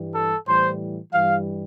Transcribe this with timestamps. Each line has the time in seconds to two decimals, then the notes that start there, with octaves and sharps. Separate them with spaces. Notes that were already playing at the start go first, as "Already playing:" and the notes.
Already playing: G2 E3 G3
0.13 A4
0.46 A2 E3 G3 C5
1.12 G2 E3 G3 F5